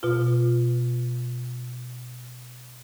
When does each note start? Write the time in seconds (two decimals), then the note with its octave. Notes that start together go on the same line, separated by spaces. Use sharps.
0.03 B2 F4